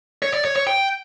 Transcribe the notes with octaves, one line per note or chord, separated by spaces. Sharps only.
C#5
D5
C#5
C#5
G5